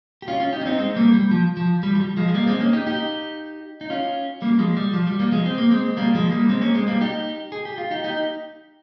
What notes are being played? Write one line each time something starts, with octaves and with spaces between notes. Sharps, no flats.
G4
C#4 F4
C#4 F4
D#4 G4
C#4
C4 D#4
G#3 C4
G3 A#3
G3
F3
F3
G3
F3
G3
F3 G#3
G#3
G3 A#3
G#3 C4
A#3 C#4
D#4 G4
D#4 G4
D#4
C#4 F4
G3 A#3
F3 G#3
G3
F3
G3
G3 A#3
F3 G#3
C4
A#3
G#3 C4
G3 A#3
F3 G#3
G3 A#3
G#3 C4
A#3 C#4
G#3 C4
G3 A#3
D#4 G4
G#4
G4
F4
D#4 G4
D#4 G4